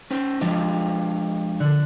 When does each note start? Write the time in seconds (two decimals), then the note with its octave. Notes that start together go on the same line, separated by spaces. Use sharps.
0.11 C#4 C5
0.41 F3 G#3 D4 F5
1.60 D3 F#6